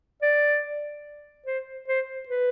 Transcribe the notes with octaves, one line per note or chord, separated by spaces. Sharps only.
D5
C5
C5
B4